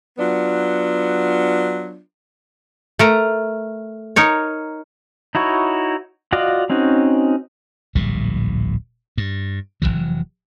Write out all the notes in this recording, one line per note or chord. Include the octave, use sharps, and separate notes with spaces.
F#3 B3 D4 F4
A3 A#4 A#5
D#4 A#4 C#5
D#4 E4 F#4 C#5
F4 F#4 D5 D#5 F5
C4 C#4 D#4 F#4
D1 A#1 A#2 G3
G2
F1 C2 E3 F#3